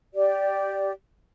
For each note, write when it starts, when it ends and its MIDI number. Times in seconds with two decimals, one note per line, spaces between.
0.14 0.92 67
0.14 0.92 74